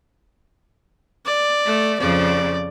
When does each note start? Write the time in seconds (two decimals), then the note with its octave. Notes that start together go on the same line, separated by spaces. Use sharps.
1.26 D5
1.66 A3
2.00 F2 C#3 F3 D5